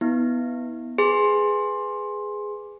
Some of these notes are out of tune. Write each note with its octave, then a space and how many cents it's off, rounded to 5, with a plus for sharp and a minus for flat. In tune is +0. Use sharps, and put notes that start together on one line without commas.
B3 +0 E4 -35
G#4 +0 B4 +10 C6 +15